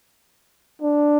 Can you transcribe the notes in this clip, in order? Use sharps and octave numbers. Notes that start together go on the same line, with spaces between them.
D4